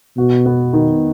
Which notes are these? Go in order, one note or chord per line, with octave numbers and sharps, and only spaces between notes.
B2 F#4
B3
D#3